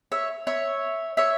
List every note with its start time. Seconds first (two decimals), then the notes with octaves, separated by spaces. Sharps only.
0.12 C#5 E5
0.47 C#5 E5
1.17 C#5 E5